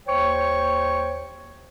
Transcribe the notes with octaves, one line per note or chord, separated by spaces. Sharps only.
D#2 C5 C#5 G5 C#6